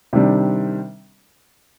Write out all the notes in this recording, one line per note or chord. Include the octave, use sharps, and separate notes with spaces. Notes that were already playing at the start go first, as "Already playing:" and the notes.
C3 D#3 G3 D4